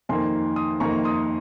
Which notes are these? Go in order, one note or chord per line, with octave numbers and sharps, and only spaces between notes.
F2 D#3 A#3 G#5 C6
C6 D#6
F2 D#3 A#3 A#5 C#6
C6 D#6